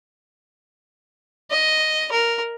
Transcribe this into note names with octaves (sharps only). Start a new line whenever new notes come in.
D#5
A#4